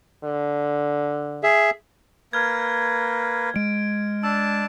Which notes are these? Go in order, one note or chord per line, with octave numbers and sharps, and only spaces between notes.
D3
G#4 E5
A#3 B4 F6 G#6
G#3 D7
D4 A5 E6